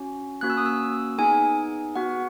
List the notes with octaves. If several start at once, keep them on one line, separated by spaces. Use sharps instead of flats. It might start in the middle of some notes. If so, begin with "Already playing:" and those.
Already playing: C#4 F#4
A#3 C#4 F#4 F#6
E6
D#6
E6
B3 D#4 G#4 G#5
B3 F#4 F#5